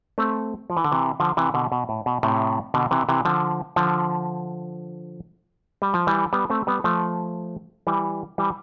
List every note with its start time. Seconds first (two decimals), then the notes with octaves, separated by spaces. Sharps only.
0.18 A3 C4
0.70 F3
0.77 E3
0.84 D3
0.92 C3 E3
1.20 D3 F3
1.37 C3 E3
1.54 B2 D3
1.72 B2
1.89 A2
2.06 B2
2.23 A2 C3
2.74 B2 D3
2.91 C3 E3
3.09 C3 E3
3.25 D3 F3
3.76 D3 F3
5.82 G3
5.94 F3
6.07 E3 G3
6.33 G3 B3
6.50 A3 C4
6.67 G3 B3
6.84 F3 A3
7.87 E3 G3
8.38 E3 G3